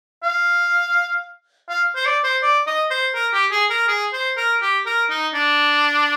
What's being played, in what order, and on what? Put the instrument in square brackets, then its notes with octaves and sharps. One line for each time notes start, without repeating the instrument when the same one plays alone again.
[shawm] F5
F5
C5
D5
C5
D5
D#5
C5
A#4
G4
G#4
A#4
G#4
C5
A#4
G4
A#4
D#4
D4